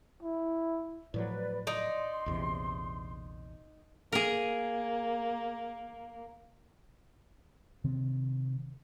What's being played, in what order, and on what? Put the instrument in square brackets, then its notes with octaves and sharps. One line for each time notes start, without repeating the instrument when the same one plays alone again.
[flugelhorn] E4
[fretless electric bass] A2 F3 F#3 [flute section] B4 D5
[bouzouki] D#4 D5 [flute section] C6
[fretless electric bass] A#1 E2 C3
[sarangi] A#3 [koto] G#4 A#4
[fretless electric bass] C3 D#3 C4